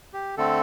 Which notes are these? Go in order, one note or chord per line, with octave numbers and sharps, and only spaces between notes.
G4
D3 A3 C4 A4